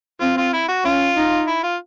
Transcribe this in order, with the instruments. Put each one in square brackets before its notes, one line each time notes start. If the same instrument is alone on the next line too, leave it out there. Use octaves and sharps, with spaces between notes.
[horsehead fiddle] C4 [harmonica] F4
[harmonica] F4
E4
F#4
[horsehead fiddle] C#4 [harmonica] F4
[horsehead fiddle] D#4
[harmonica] E4
F4